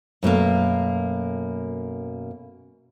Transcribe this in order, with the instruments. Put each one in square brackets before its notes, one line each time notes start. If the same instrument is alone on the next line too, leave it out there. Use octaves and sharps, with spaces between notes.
[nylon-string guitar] F#2 B2 A3 A#3